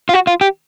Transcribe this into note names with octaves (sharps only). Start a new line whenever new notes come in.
F4
F#4
F4
G4